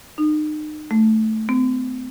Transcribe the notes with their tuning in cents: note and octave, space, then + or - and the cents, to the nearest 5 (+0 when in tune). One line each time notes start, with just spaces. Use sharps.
D#4 -35
A3 -5
C4 -40